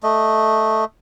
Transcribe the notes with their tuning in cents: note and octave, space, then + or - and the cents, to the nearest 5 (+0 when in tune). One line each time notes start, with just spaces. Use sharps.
A3 +0 D#5 -5